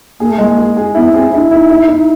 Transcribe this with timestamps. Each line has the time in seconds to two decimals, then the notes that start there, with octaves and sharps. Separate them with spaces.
0.20 A#3 G#4
0.31 A3
0.38 G#3 A#3
0.57 G#4
0.77 G#4
0.95 B3 E4
1.13 C4 G#4
1.32 D4 E4
1.51 D#4 E4
1.69 D#4 E4
1.88 E4